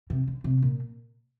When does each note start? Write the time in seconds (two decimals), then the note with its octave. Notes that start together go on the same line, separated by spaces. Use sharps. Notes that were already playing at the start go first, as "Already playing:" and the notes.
0.10 C3
0.27 D3
0.44 C3
0.62 A#2